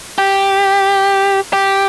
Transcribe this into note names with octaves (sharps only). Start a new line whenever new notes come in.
G4
G4